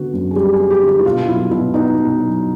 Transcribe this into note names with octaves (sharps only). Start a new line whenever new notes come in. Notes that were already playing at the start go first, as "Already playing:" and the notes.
Already playing: D3 B3 F#4
F#2
G#4
G3 G4
G#4
B3
G4
D3 G4
E4
B2 F4
F#3 E4
B2 E4
B3 D#4
B2
F#3